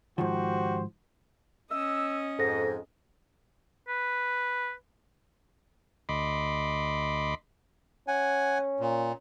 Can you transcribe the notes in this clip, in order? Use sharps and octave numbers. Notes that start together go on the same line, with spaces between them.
G#2 D#3 F3 F#4 G4 C5
C#4 D#5 E6
F2 G#2 A4 A#6
B4
D2 D#5 B5 C6 D6
C#4 F#5 G#5
A#2